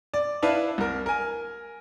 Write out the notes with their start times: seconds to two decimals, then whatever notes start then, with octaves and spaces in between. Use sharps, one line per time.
0.14 D5
0.42 D4 E4 B4 F5 A5
0.78 C2 A#4
1.06 A#4 G#5